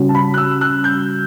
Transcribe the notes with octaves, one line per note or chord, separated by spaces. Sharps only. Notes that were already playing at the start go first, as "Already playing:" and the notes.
Already playing: C#3 G3 C#4 F#4
A5
B5
F#6
E6
F#6
G6